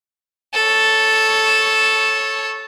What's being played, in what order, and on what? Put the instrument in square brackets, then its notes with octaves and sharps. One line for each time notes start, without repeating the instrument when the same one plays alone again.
[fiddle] A4 C#5